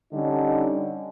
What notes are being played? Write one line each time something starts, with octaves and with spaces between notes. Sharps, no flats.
D3 G3 C#4 D#4